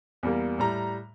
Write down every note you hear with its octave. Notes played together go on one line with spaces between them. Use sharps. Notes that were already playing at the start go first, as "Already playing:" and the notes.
E2 G3 A#3
A2 G3 A#5